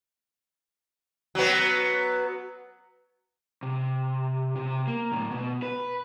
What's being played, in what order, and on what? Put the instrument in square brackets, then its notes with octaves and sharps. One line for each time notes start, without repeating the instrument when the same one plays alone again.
[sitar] F#3 B3
[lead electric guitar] C3
C3
A#3
A2 D3
B2
B4